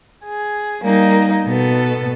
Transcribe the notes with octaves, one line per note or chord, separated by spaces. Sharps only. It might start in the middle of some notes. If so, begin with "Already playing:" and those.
G#4
G3 A#3 D#4
B2 B3 A4